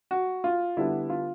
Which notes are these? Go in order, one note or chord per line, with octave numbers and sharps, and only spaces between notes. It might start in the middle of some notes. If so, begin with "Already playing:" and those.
F#4
F4
D3 G3 B3 D4 E4
F4